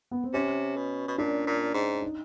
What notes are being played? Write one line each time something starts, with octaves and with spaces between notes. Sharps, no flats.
B3
C4
C3 C#4
B2
B2
A#2 D4
A#2
G#2
D#4